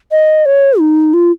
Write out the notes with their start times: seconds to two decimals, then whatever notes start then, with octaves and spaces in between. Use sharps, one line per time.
0.11 D#5
0.46 C#5
0.79 D#4
1.14 F4